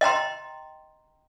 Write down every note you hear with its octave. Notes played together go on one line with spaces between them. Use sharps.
D#5 G5 A#5 C6